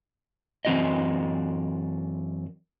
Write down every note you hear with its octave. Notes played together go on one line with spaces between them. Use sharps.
F#2 E3 C4 F#4 D5 D#5